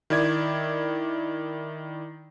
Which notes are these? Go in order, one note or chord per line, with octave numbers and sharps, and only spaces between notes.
D#3 E4 D5 G#6